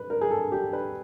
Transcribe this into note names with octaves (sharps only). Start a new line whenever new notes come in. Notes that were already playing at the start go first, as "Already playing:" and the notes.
Already playing: B4
A#4
G#4
A4
G4
B4